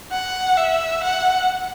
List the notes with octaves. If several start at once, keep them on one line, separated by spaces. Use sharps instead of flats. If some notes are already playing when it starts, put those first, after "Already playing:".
F#5
E5
F#5